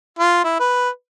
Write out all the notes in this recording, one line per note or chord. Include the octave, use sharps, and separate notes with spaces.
F4
E4
B4